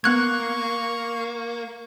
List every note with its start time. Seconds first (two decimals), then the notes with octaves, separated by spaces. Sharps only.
0.04 A#3 B3 C#6 F#6 G#6